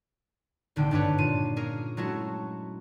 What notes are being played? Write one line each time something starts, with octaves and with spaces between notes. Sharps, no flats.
D#1 G#1 D3 G5
G#1 G2 D4 G4 B4 C#5
A#2 F4 D#7
A#3 C#4 G#4 A#4
F#3 G#3 A3 C#4 E4 F#4